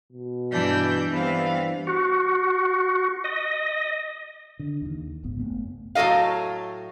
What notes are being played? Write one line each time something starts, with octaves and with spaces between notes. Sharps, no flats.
B2
G2 E3 D4 G6
G2 B3 C4 F5
F#4
D#5
D3
D#2 D#3
D#1 G#1 C#2 B3
F#1 A3 B3
A2 F#3 A4 D#5 F5